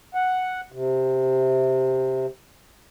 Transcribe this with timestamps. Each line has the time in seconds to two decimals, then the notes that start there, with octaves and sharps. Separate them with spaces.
0.15 F#5
0.72 C3